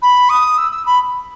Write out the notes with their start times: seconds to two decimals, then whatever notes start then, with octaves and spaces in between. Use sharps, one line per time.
0.02 B5
0.29 D#6
0.57 E6
0.71 E6
0.86 B5